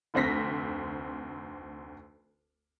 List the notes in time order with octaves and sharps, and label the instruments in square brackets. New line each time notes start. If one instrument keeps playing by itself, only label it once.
[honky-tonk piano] F1 D2 C4 A#6 B6